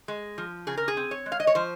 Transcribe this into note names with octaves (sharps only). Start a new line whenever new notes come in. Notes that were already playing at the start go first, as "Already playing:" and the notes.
G#3
F3
C#3 G#4
A#4
G#4
C4
C#5
G#3
F5
D#5
C#5
F3 C5